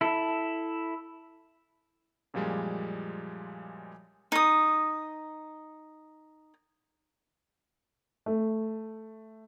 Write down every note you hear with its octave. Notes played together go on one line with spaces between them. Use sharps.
E4 A4
F#2 A#2 F3 G3 G#3
D#4 D#6
A3